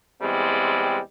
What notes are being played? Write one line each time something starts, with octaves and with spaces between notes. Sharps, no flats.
E2 G3 G#3 C4